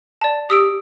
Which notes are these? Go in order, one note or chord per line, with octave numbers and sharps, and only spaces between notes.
D5 A5
G4 D#6 E6 D7